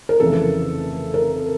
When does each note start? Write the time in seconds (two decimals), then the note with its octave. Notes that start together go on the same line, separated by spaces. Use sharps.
0.09 A#4
0.20 F1 F2 C#3 E3 A4
1.14 A#4